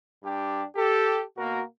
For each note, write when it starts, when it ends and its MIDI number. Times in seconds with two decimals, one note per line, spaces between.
0.24 0.63 43
0.24 0.63 62
0.24 0.63 67
0.76 1.22 67
0.76 1.22 69
1.38 1.63 47
1.38 1.63 58
1.38 1.63 66
1.38 1.63 70